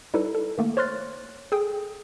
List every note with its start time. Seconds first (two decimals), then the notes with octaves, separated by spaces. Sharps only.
0.14 G3 D#4 E4 A4 B4
0.35 A4
0.58 D#3 A3 A#3
0.77 C5 C#5 C6 F6 F#6 A6
1.52 G#4 A4 G5 D#6